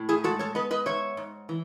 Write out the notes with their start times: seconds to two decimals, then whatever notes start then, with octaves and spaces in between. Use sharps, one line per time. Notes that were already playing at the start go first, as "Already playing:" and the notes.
Already playing: A2
0.09 E4 G#4
0.24 G#3 F#4 A4
0.39 A4 C#5
0.55 B3 B4 D#5
0.71 B4 D#5
0.86 G#2 C#5 E5
1.17 G#2
1.49 E3